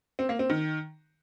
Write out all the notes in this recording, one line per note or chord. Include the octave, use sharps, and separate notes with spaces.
C4
A#3
C4
D#3